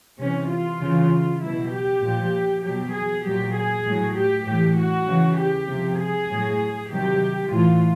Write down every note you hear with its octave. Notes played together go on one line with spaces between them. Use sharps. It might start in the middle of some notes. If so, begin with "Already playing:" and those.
C3 E3 C#4
F4
C#3 E3
B2 F#3 E4
G4
A#2 F3
B2 F#3 G4
G#4
A#2 F#3 G4
G#4
A2 F#3
G4
A2 E3 G4
F#4
C#3 E3
G4
C3 F3
G#4
A2 F#3
C3 D#3 F#3 G4
A2 E3 F4